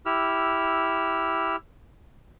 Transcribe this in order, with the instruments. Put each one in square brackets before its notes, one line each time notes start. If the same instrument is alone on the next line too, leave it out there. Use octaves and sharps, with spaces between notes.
[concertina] E4 G4 E6 F6